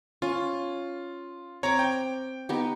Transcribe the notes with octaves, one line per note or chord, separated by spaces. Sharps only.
C#4 F4
C4 C#5 A#5 D6
G5
B3 D#4 G4